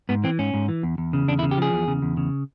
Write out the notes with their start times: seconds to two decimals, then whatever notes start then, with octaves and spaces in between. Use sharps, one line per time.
0.09 G#2 B3
0.24 E3 C4
0.39 G#2 C#4
0.54 G#2
0.68 E3
0.83 E2
0.98 E2
1.13 C#3
1.28 E2 D4
1.39 E4
1.43 C#3
1.51 G4
1.58 F3 G#4
1.73 E2
1.88 C#3
2.02 E2
2.17 C#3